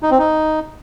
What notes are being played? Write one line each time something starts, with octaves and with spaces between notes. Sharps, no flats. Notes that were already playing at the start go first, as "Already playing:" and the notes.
D#4
C4
D#4